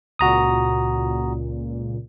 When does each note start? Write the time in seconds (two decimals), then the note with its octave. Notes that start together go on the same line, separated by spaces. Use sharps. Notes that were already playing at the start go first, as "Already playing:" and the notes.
0.19 C#2 A#2 F#4 A#5 D#6